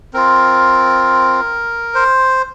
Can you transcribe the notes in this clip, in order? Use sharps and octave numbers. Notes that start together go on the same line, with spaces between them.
C4 F4 A#4
C5